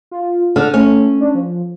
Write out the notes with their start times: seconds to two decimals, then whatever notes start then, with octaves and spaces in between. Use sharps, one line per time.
0.11 F4
0.56 D3 F6
0.74 A3 C#4
1.20 D4
1.35 F3